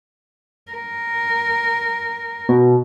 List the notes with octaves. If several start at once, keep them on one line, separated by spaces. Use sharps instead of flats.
A#4
B2